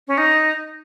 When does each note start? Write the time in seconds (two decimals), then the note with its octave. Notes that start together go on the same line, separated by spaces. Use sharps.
0.08 C#4
0.18 D#4